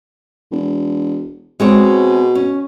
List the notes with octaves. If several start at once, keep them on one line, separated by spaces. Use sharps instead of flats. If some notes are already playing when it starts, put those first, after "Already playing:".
E1
B2 G#3 C4 C#5
C#4